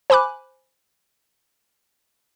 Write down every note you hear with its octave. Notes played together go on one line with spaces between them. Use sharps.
C5 G#5 B5 D6 F#6